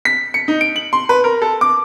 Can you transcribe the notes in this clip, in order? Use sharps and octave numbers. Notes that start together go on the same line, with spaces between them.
B6
C#7
D#4
D7
F#7
C6
B4
A#4
A4
D6